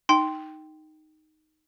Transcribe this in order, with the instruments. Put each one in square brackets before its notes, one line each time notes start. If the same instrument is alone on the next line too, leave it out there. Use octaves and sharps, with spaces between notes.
[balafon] D#4 [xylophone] G5 C6